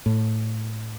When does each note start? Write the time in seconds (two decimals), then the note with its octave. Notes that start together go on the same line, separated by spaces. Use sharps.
0.06 A2